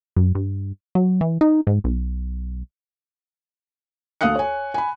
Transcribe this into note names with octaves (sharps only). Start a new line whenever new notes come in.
F#2
G2
F#3
E3
D#4
G#2
B1
D2 A4 F5 D#6 F#6 C#7
C#5 G#5
G#5 B5